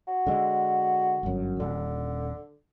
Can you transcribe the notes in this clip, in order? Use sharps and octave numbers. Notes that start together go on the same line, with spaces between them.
F#4
D3 G#3
G1 F#2
D#1 D3